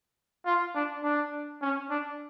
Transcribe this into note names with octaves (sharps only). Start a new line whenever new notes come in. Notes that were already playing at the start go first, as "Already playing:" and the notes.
F4
D4
D4
C#4
D4